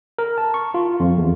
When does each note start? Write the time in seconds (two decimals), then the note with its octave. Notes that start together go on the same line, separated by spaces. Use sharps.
0.19 A#4
0.38 A5
0.54 C#6
0.74 F4
1.00 F2
1.18 E2